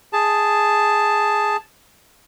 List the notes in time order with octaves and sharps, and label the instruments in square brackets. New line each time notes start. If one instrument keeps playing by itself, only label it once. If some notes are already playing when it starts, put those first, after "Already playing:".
[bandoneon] G#4 A5